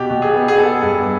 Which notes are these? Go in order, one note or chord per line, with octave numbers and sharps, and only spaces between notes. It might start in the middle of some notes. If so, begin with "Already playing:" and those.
Already playing: B2 G4
B2
G#4
B3
G#4
B3 A4
G2